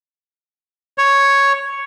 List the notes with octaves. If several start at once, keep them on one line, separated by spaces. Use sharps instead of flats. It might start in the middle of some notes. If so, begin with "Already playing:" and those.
C#5